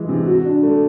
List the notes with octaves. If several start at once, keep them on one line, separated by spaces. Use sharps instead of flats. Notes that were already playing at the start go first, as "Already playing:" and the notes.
Already playing: E3 G#3
C3
F#4
D4
A3